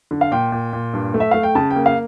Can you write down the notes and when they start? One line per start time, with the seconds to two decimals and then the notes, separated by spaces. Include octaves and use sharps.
0.11 D3
0.21 F5
0.31 A#2 G5
0.52 A#2
0.73 A#2
0.93 G2
1.14 A3
1.20 E5
1.31 A3 F5
1.43 G5
1.55 C#3 A5
1.70 G5
1.75 A#3
1.86 F5